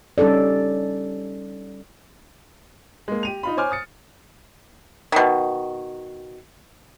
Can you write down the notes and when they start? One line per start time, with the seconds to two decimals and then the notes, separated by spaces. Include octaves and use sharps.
0.18 G3 C#4 D#4 A4 D5
3.08 G#3 A#3
3.23 G4 D#7 F7
3.43 D#4 F4 B5
3.57 C5 C#5 G#5 D6 F6
3.71 D#6 A6 C#7
5.12 B2 D#3